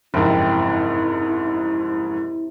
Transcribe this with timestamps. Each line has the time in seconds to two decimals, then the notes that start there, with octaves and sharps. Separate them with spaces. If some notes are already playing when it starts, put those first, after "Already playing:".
0.14 F#1 F2 G#2 C3 E4